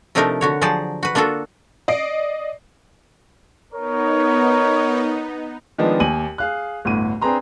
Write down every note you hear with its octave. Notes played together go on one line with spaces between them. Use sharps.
C3 F3 A3 D4 D#4 A#4
D3 F#4 C#5
F3 F#3 G#4 C5 D5 A5
F#4 B4
A#3 D4 F4 F#4 A4
D5 D#5 C7 D7
B3 D#4 A#4 C#5
D#3 F3 G#3 B3 D4 D#4
D#2 G#5 D#7 F#7
G#4 F5 F#6
G1 D2 A2 D#7
C4 D4 G#4 B4 A#5 C6